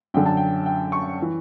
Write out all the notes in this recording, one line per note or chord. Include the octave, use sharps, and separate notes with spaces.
F#2 D3 F#3 G5
A5
G5
G5
C#6
E3